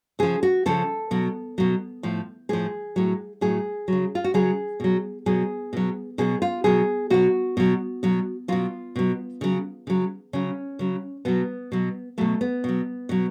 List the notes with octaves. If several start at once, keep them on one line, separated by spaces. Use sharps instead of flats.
C#3 F3 G#4
F#4
C#3 F3 A4
B2 F#3
B2 F#3
A2 F3
A2 F3 G#4
A2 F#3
A2 F#3 G#4
C#3 F#3
F4
F#4
C#3 F#3 G#4
B2 F#3
B2 F#3 G#4
B2 F#3
B2 F#3 G#4
F4
B2 F#3 G#4
B2 F#3 F#4
B2 F#3
B2 F#3
B2 F#3 F4
B2 F#3
C#3 F#3
C#3 F#3
C#3 F#3 C#4
C#3 F#3
B2 F#3 B3
B2 F#3
B2 F#3 A3
B3
B2 F#3
B2 F#3